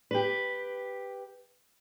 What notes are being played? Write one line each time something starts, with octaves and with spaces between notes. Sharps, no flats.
G4 B4